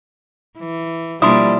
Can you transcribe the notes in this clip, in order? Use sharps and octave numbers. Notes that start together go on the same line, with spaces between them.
E3
B2 F3 G3 A#3 D4 E4 C6 D#6